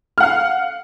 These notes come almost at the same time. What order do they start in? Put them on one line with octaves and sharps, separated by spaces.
F6 F#5 F5